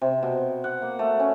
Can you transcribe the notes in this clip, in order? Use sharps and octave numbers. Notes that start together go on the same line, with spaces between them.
C3
B2
F#5
A#3
A3
C#4